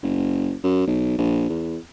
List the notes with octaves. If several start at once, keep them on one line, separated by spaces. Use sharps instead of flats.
F#1
F#2
B1
A#1
E2